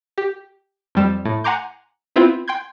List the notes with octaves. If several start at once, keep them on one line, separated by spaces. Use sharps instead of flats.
G4
F2 G3 E7
A2
F#5 G#5 A#5 C6 D6 G6
B3 C4 E4 F4
G5 C6 G6 G#6